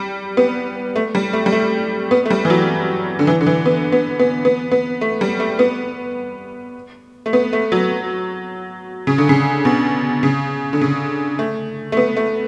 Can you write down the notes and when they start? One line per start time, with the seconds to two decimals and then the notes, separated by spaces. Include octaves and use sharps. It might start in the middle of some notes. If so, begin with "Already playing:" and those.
Already playing: G3
0.37 B3
0.96 A3
1.15 G3
1.33 A3
1.46 G3
1.52 A3
2.11 B3
2.26 A3
2.30 G3
2.45 E3
2.50 F#3
3.19 D3
3.27 E3
3.41 D3
3.47 E3
3.66 B3
3.92 B3
4.20 B3
4.45 B3
4.72 B3
5.01 A3
5.21 G3
5.40 A3
5.59 B3
7.26 A3
7.33 B3
7.53 A3
7.72 F#3
9.07 C#3
9.18 D3
9.29 C#3
9.65 B2
10.23 C#3
10.73 D3
10.81 C#3
11.39 A3
11.92 A3
11.97 B3
12.17 A3